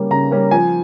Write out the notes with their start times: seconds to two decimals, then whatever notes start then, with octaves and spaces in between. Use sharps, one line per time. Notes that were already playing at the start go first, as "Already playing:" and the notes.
Already playing: C#3 G3 A#3 C#4
0.11 C#3 A#5
0.31 G3 A#3 C#4
0.51 F3 G#5